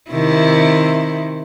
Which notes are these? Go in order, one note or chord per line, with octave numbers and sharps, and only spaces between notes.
C3 D#3 E4